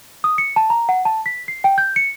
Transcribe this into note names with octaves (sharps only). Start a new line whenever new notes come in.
D#6
C#7
A5
A#5
F#5
A5
B6
C7
G5
G6
C#7